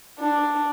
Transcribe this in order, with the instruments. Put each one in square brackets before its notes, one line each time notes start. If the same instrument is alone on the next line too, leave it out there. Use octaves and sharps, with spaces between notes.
[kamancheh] D4